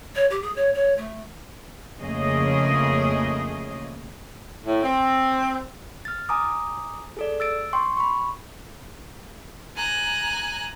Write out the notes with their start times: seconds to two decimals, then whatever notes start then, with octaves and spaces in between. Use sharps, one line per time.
0.15 C#5
0.30 G4
0.42 G#4
0.56 C#5
0.74 C#5
0.98 A3
1.99 F2 C#3 A3 A#3 G#4 D#5
4.65 A2
4.83 C4
6.05 F6 A6
6.29 G#5 A#5 D6 D#6
7.17 G#4 A4 D5
7.40 E6 A6 D7
7.73 G5 C6 C#6
7.97 B5 C#6
9.75 G#5 A#5 F#6